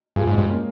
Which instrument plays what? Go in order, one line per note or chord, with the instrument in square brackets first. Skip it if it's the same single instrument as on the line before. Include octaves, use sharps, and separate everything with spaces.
[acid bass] G2 [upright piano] F4 G#4
[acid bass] G#2
[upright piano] G#3 C4
[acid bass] G2
[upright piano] A#3 C#4